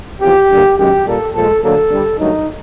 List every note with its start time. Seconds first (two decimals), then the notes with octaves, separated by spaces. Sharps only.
0.21 E2 C3 F3 G4
0.50 G2 D3 G3 A#3
0.77 F#2 D#3 G#3 G4
1.06 A#2 G3 A#3 A4
1.33 A#2 F3 G#3 A4
1.62 D2 D3 F#3 A#3 A4
1.90 G2 D3 G3
2.18 G2 D#3 F#3 A3 D#4